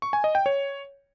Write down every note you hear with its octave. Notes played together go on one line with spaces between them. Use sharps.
C#6
G#5
D#5
G5
C#5